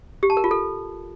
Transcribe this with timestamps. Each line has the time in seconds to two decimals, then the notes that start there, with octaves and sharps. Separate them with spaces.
0.23 G4
0.30 A5
0.37 A#4
0.44 F4
0.51 A4